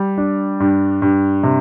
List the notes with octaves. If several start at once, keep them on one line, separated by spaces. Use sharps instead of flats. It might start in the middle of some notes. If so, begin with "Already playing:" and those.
Already playing: G3
D4
G2
G2
C3